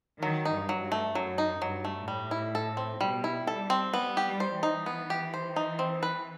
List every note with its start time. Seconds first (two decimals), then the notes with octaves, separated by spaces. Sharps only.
0.22 D#3 F#3
0.45 D#4
0.53 G2
0.69 F#3
0.84 G2
0.92 A3
1.14 F#2 F#3
1.38 D#4
1.61 G2 F#3
1.85 A3
2.08 A2 G3
2.31 E4
2.55 A4
2.77 C4
3.01 B2 G3
3.24 E4
3.47 G3 A4
3.70 C4
3.93 G3 B3
4.17 G4
4.25 G3
4.40 C5
4.56 E3
4.63 D#4
4.86 B3
5.10 G4
5.34 C5
5.56 D#4
5.79 C4
6.03 B4